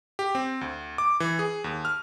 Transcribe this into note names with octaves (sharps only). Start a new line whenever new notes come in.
G4
C4
D2
D6
E3
G#4
D#2
F6